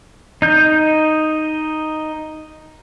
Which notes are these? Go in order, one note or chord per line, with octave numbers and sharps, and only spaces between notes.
D#4 G6